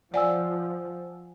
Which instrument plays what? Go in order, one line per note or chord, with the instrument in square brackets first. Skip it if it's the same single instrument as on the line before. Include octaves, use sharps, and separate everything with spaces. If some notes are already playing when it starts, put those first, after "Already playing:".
[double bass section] F3 [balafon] D5 [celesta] F#5 G#5 E6